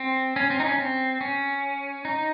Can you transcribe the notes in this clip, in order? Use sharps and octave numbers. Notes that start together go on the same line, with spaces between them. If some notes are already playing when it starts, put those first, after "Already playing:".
Already playing: C4
C#4
C4
D#4
C#4
C4
C#4
D#4